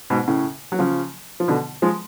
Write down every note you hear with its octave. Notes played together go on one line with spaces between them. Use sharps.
G#2 B2
A2 C#3
F#3
C#3 F3
F3
B2 D3
F3 G#3